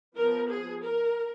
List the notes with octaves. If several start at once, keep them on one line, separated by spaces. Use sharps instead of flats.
F3 B3 A#4
G#4
A#4